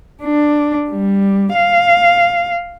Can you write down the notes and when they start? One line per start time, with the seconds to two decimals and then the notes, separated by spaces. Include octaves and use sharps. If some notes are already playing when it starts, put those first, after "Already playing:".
0.23 D4
0.90 G3
1.53 F5